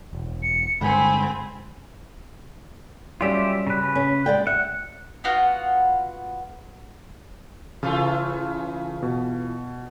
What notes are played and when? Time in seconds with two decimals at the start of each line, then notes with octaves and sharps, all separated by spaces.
0.13 E1
0.43 C#7
0.81 G2 D3 G#3 C4 G#5 B5
3.21 F#3 G3 C#4 F4 G4 E5
3.67 C#3 B4
3.95 C#4
4.26 G#3 D5 G5
4.47 E5 F#5
5.24 B3 F4 F#4 F#5
7.83 C#3 E3 A3 F4
9.02 B2